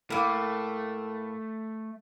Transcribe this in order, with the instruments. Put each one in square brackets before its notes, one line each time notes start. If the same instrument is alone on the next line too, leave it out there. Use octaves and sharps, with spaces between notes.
[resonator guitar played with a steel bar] A2 A#3 [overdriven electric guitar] A3